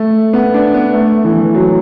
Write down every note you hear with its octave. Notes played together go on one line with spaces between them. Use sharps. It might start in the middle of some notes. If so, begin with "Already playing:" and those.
Already playing: A3
B3
D4
B3
A3
E3
E3
F#3